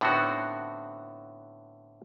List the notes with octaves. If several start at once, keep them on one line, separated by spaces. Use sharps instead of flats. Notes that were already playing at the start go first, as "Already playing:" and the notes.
A2 D3 B3 C4 D#4 F#4